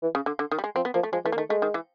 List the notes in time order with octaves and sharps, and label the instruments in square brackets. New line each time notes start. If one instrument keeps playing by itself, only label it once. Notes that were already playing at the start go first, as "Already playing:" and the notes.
[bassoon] E3
[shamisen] C#3
D3
D3
D#3
G3
G#3
[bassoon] F3 [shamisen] C4
[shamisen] B3
[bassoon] F3 [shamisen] A#3
[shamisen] A3
[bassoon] F3 [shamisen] G#3
[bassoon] E3 [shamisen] A3
[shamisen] A#3
[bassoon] D#3 [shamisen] A3
[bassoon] G#3 [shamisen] A3
[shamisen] D#3
E3